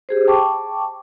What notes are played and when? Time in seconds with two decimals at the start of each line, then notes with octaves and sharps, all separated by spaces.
0.09 G4 G#4 C5
0.27 G5 A5 C#6 D6